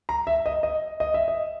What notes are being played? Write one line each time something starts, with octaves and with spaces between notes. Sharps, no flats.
A#5
E5
D#5
D#5
D#5
E5
D#5